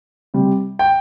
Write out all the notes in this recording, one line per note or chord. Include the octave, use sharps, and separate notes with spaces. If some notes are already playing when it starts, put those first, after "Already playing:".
C3 G3
G5